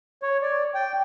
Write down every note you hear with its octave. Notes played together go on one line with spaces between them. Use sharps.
C#5
D5
G5